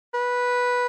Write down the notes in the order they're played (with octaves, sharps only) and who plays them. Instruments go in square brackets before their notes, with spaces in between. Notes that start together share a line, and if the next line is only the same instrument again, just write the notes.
[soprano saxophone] B4